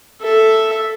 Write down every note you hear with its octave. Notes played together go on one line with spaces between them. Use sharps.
A4 E5